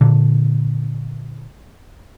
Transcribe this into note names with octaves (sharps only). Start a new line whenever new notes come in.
A#2 D3